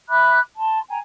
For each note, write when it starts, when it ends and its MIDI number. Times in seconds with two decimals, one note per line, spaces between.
0.08 0.38 76
0.08 0.38 83
0.08 0.38 86
0.08 0.38 90
0.56 0.79 81
0.56 0.79 84
0.89 0.97 79
0.89 0.97 80
0.89 0.97 82